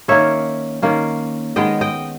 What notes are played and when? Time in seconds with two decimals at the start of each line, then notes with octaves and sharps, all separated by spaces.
0.08 D#3 A#3 C#4 C#5 E5
0.82 D#3 A#3 C#4
1.56 D#3 G#3 B3 D#5 G5
1.81 D#5 G5